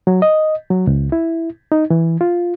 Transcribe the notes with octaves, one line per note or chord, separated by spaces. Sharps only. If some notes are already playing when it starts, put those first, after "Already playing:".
F#3
D#5
F#3
C#2
E4
D#4
E3
F4